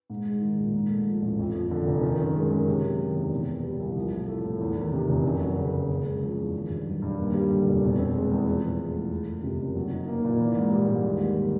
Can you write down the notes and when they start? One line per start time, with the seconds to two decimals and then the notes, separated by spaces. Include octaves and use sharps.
0.10 G#2
0.26 G#3
0.41 D#3
0.58 A#1
0.74 G#2
0.90 A3
1.06 F3
1.22 A1
1.39 F2
1.54 F3
1.71 D3
1.87 F1
2.03 D#3
2.19 F#2
2.35 G#3
2.51 F#2
2.67 C3
2.84 F#3
2.99 D#3
3.16 E2
3.32 B2
3.48 B3
3.63 G3
3.79 C2
3.96 F3
4.13 A2
4.28 A3
4.45 A2
4.60 E2
4.77 D#3
4.93 C3
5.08 F1
5.25 F#2
5.41 F#3
5.57 C#3
5.73 F#1
5.89 C#3
6.06 G#3
6.22 F3
6.37 E2
6.54 D#3
6.70 G2
6.85 F#3
7.02 G2
7.18 D#2
7.34 G3
7.50 D3
7.67 F1
7.83 B2
7.99 C4
8.14 G#3
8.31 E2
8.46 F3
8.63 A2
8.80 G#3
8.95 A2
9.11 F2
9.28 F#1
9.43 C3
9.60 F#1
9.75 F#3
9.91 D#4
10.08 A#3
10.25 A#2
10.39 E3
10.56 G#2
10.72 G3
10.89 G#2
11.05 D#2
11.20 G3
11.37 D3